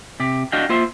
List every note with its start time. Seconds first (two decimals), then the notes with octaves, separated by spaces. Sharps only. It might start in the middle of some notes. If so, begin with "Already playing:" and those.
0.20 C3 G4
0.52 D4 F#4 D#5 F5 G5
0.69 A#3 F4 C5 E5